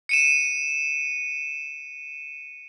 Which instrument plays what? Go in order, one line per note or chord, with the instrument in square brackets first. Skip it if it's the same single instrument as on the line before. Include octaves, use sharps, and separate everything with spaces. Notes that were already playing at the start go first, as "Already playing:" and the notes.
[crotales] C#7 D#7 E7